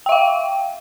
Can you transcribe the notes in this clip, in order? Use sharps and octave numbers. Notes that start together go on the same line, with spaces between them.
E5 F5 G5